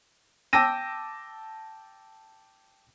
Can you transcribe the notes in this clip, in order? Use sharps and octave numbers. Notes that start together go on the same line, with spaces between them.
G5 A5 D6 E6 A#6 D#7